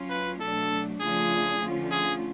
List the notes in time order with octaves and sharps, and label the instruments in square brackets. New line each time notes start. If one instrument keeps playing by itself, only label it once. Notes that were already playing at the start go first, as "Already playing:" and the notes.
Already playing: [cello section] F#3 C#4 F4
[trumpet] B4
[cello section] B2 F#3 A3 D4 [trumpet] A4
[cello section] C#3 F3 A3 D4 F4 [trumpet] G#4
[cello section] D3 F3 A3 C#4 F4
[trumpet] G#4